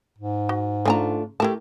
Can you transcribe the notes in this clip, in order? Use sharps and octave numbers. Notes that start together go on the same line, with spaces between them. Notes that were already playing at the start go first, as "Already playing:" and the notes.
G#2
F#4
C#3 A3 D4 F4 G#5 A#5
A3 E4 G4 A#4 A5